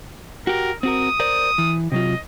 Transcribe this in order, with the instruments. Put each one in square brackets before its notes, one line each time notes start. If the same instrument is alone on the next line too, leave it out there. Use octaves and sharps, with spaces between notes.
[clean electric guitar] F#4 G4 [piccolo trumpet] A#4
[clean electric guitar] C4 F#4 A#4 [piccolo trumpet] D#6
[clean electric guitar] A#4 C5 D5
E3
[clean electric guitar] C3 F#3 F4 [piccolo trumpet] D#5